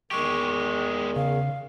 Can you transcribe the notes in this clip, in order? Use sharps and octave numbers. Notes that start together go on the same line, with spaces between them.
E2 D#3 G#3 G4 C#6
C#3 F5